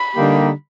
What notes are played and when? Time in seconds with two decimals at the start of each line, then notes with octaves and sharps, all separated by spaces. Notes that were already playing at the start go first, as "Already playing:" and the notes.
Already playing: B5
0.15 D3 G3 A#3 D#4 G4